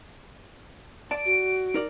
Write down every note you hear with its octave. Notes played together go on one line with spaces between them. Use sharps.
D5 A5 D7
F#4
D#4 A#4 D5